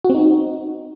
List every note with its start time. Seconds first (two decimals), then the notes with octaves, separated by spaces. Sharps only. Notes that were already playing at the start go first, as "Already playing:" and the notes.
0.05 F#4
0.10 C4
0.15 D#4